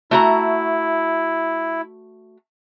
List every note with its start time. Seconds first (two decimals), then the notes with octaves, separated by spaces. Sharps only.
0.11 A3 E4 F#4 A#5